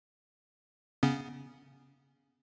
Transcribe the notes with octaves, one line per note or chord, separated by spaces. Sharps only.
C#3 B3 C#4